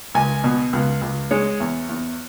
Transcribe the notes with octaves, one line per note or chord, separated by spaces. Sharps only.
C#2 G#5
B2
C#2
C#2
G#3 C#5
E2
E2